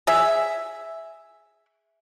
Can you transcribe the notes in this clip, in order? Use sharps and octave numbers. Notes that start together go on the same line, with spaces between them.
G#4 E5